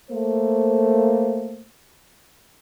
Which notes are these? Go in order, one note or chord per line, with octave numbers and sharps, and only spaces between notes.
A3 A#3 C5